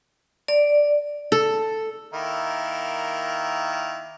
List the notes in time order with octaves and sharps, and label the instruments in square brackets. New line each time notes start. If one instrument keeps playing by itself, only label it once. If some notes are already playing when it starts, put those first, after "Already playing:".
[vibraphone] D5
[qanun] A4
[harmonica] D#3 A#3 E4